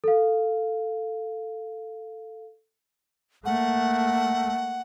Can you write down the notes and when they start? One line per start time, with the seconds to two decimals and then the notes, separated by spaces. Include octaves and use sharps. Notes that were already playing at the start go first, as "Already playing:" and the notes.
0.04 A4 F5
3.45 A3 A#3 F#5